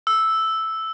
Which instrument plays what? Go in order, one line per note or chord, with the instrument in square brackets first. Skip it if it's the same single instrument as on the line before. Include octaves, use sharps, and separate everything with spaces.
[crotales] E6